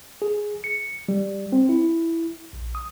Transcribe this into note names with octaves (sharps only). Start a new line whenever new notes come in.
G#4
C#7
G3
C4
E4
A#1
D#6